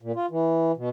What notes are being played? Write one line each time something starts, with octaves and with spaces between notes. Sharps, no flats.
A#2
F4
E3
B2